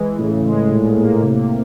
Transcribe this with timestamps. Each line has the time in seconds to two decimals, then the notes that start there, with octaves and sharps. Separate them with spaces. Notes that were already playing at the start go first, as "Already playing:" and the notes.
Already playing: E3 G#3
0.19 A2 C#3
0.45 G#3
0.70 A#2
0.95 A#3
1.22 C3